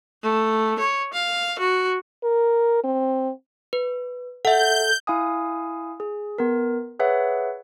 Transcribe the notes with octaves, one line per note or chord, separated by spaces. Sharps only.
A3
C#5
F5
F#4
A#4
C4
B4
A4 E5 F#5 G6
E4 F5 G#5 D#6
G#4
B3 A#4
G#4 B4 C#5 E5 F#5